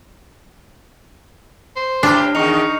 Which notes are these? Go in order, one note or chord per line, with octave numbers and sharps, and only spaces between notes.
C5
A2 D4 G4 B4 F6 A#6 C7
E2 D#3 D#4 C#6 C#7 F7